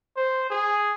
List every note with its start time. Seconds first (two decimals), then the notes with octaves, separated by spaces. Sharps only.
0.17 C5
0.50 G#4